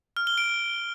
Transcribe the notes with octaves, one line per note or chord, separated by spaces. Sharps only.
F6
G7
D7